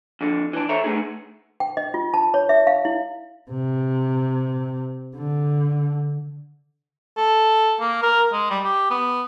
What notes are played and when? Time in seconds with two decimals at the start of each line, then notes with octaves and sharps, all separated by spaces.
0.21 F2 D3
0.53 E3 D4
0.69 A4 C5 C#5 E5 A#5
0.84 D3 A3 B3 D#4 G#4
1.60 G5
1.77 D#5
1.94 F4
2.14 A5
2.34 C#5
2.49 E5
2.67 F5
2.85 E4
3.51 C3
5.16 D3
7.17 A4
7.80 A#3
8.03 A#4
8.32 G#3
8.50 G3
8.64 G4
8.91 B3